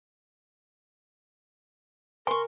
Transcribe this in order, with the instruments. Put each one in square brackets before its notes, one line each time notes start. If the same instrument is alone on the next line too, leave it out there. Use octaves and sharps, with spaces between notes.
[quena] A#4 [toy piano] G#5 [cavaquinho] C6 C#6